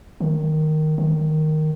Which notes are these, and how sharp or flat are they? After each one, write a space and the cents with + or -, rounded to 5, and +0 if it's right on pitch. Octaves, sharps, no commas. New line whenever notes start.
D#3 -5
D#3 -5